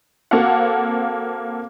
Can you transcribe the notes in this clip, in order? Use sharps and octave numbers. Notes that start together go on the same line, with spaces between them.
A#3 C4 F#4 A4 F5 F#5